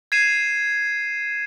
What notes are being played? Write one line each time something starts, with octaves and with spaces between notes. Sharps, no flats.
G#6 C7 D#7 E7